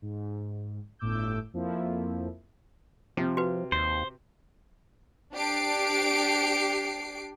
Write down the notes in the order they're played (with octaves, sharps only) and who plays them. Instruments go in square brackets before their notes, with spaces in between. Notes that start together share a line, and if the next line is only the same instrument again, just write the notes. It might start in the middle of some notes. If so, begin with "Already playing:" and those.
[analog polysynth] G#2
G1 A2 D6 E6 G6
F2 F3 A#3 E4
[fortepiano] C3 [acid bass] F3
[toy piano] F#4 B4
[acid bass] D#2 [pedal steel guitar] C5
[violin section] D4 G4 C7 D7